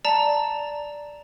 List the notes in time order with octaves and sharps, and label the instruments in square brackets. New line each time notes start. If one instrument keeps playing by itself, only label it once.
[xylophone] D5 A5 A#5